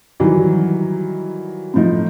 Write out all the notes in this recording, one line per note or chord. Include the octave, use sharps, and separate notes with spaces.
D#3 E3 F#3 G3
A2 F3 D#4